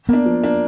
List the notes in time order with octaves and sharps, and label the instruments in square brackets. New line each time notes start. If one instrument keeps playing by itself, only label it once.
[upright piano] A#3 D4 [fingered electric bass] B3
[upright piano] F3
A#3 D4